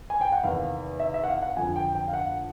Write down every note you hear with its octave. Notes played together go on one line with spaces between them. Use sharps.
G#5
G5
F#5
E2 C3 D#3 F5
E5
E5
F#5
F5
F#5
F2 D3 F3 G#5
G5
G5
F5
F#5